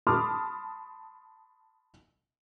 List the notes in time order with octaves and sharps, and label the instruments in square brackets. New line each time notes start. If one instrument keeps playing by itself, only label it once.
[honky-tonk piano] A5 B5 C6 D6 D#6 F6